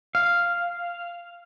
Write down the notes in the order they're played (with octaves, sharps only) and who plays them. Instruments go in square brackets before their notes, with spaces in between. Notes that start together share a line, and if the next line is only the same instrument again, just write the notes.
[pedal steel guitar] F5